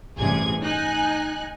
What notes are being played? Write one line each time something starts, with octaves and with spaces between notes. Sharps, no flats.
A1 G2 C3 G#4 G#6
D#4 G#5 F#6